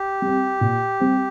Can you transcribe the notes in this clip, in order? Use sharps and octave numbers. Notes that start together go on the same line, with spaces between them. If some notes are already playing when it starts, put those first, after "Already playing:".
Already playing: G4
G3 C4
A#2
G3 C4